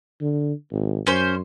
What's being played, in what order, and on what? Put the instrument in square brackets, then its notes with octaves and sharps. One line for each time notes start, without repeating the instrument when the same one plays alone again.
[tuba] D3
G#1
[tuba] F#2 [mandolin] C#4 C5